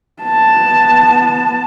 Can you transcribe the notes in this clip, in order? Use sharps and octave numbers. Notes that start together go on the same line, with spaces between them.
B3 A5